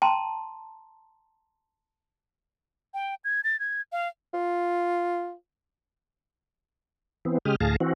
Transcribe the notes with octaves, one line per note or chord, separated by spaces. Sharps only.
G5 A5 A#5 C6
G5
G#6
A6
G#6
F5
F4
E3 B3 C4
C#3 G#3 G4 D#6 F6
D2 A2 G#4 F5 A5 A#6
E3 C4 F#4